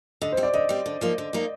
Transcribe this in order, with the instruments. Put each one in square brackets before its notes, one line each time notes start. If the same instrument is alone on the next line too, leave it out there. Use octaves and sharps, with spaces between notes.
[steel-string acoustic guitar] D3 [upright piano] D#5
[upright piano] C5
[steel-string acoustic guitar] G3 C4
[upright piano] D5
[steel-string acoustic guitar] D3 [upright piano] D#5
[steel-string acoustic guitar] G3 C4
D3
F3 A#3 D#4
D3
F3 A#3 D#4